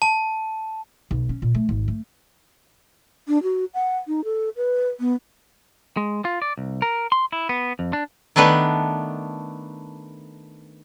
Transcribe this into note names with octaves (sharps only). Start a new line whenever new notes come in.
A5
B1
C#4
A#2
A3
G#1
A3
D4
F#4
F#5
D#4
A4
B4
B3
G#3
F4
D5
C2
A#4
C6
E4
B3
F2
D4
D#3 A3 B3 D4 B4